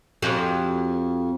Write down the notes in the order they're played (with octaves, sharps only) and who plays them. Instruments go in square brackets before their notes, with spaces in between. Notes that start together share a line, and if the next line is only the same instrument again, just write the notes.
[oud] F2 F#4 G4